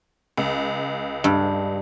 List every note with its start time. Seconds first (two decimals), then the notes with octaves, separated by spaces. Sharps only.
0.37 C#2
1.24 G2